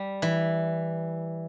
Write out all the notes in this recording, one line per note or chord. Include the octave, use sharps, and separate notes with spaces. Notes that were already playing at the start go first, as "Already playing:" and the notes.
Already playing: G3
E3